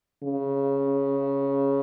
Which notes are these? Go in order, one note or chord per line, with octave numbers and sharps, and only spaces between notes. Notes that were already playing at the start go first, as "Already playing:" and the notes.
C#3